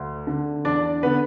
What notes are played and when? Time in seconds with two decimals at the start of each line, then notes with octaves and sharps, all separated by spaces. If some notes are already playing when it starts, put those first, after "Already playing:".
Already playing: D2
0.27 D3
0.65 E2 D4 D5
1.03 D3 B3 B4